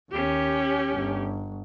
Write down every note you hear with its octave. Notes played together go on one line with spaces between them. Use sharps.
D#2 C#4 G4
G1